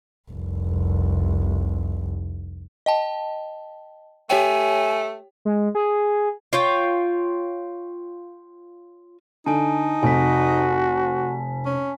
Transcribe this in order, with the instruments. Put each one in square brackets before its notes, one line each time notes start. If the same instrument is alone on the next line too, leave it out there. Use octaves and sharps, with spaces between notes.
[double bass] F1 C2
[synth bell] D#5 G5 A5
[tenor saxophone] A3 [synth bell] G4 C#5 G5 [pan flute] G#5
[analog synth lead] G#3
G#4
[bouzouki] F4 C#5 G5
[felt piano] D3 [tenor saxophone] D#4 [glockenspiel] G#5 A5
[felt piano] F1 [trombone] F#4 [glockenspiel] G#5 B6
[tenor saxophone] C#4